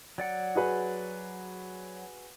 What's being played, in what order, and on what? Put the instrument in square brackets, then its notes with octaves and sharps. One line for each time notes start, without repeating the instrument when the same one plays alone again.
[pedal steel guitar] F#3 D5 F#5
[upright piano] F#4 G#4 B4